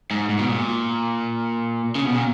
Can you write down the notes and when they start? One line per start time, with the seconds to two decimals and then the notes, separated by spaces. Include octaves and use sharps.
0.11 G#2
0.30 G#2
0.39 B2
0.48 A#2
1.95 C#3
2.06 B2
2.14 A#2